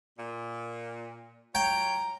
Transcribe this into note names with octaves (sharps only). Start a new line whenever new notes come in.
A#2
F#3 F4 C#5 G5 A#5